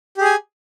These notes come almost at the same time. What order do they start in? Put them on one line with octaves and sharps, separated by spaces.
G4 G#4 G#5